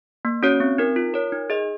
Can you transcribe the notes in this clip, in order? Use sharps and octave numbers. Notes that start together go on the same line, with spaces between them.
A#3
C#4 F#4 C#5
C4
D#4 A#4
F4
A#4 C#5
D#4
G#4 D#5